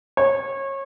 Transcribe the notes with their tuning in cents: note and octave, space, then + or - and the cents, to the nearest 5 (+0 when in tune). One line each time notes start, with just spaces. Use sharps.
C#5 -25